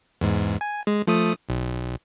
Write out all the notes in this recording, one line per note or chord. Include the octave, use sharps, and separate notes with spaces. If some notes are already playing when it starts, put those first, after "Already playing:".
E2 G#2
G#5
G#3
F3 A3 D#6
B1